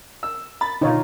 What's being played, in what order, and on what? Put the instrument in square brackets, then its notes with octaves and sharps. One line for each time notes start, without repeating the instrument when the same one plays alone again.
[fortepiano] E6
[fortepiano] B5 [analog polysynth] A6
[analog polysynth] B2 D3 [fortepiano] D#3 F4 [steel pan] D#4 C#5